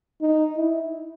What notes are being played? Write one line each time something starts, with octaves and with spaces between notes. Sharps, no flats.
D#4
E4